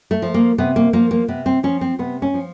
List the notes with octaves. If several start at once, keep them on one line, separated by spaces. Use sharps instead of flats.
A3
F3
A#3
C3 B3
A#3
F3 A#3
A#3
C3 B3
C4
F3 C#4
C4
C3 B3
C#4
F3